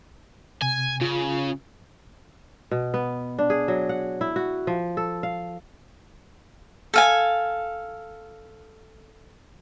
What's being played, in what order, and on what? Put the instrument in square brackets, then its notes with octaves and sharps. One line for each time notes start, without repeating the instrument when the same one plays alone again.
[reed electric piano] C3 [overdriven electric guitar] G#5
[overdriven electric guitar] C#3 [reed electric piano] F4
[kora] B2
B3
D4
G#4
F#3
F#5
E4
F#4
F3
A4
F5
[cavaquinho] A4 F5 G#5